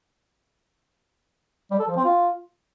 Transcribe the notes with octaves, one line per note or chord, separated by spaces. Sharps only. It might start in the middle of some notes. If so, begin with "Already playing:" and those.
G3
A4
F3
C4
F4